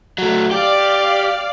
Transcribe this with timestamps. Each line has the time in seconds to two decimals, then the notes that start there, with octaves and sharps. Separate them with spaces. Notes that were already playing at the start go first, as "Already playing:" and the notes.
0.18 F#3 A3
0.51 G4 D5 F5